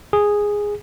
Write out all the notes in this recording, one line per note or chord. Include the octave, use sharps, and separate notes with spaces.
G#4